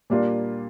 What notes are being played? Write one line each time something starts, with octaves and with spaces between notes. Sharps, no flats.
A#2 G3 A#3 D4 F4